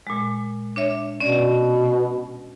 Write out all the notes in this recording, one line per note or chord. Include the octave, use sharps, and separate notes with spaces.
A#2 G#3
D4 C#5 E5
B2 C#4 D5